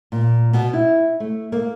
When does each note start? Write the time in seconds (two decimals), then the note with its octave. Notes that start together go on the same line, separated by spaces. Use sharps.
0.12 A#2
0.53 B2
0.73 E4
1.20 A3
1.52 A#3